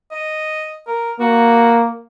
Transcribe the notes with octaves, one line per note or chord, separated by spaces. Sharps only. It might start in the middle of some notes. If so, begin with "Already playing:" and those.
D#5
A#4
A#3 F#4